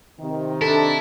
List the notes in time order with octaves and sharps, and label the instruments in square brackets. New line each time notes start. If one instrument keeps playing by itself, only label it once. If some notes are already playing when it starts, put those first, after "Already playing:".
[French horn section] C3 D#3
[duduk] D4 [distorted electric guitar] E4 [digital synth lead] A4